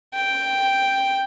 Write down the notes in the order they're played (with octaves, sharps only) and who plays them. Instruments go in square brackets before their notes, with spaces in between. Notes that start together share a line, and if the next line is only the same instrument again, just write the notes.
[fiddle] G5